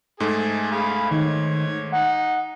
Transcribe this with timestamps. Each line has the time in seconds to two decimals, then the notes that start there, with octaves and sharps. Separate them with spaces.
0.20 G#2 G#3 A3 G#4 A4
0.71 G#4 F5 B5
1.11 D#3 C#5
1.92 D#4 F#5